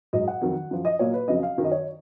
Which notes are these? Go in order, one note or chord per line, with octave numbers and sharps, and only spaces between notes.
G#2 F#3 D#5
F#5
F2 D#3 F#3
F#2 F3
D#5
A#2 F#3 C#5
B4
F2 C#3 F#3 D#5
F5
F#2 D#3 F#3
D#5
C#5